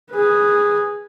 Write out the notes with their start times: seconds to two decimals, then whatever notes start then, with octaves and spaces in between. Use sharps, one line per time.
0.12 G#4 B4